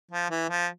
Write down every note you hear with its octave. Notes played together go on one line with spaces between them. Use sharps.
F3
E3
F3